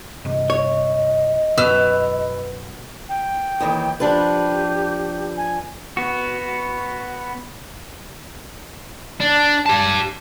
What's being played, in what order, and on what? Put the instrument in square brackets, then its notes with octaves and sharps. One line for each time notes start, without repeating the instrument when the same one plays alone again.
[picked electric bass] G2 C3 [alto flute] D#5
[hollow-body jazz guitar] C#5
[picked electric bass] F#2 [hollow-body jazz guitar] B2 [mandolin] B4 E6 F6
[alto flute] G5
[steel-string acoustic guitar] D#2 D#3 E3
[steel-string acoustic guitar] F3 D4 B4 [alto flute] G4
[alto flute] G#5
[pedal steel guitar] B3 F#4
[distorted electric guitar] D4
G4 A5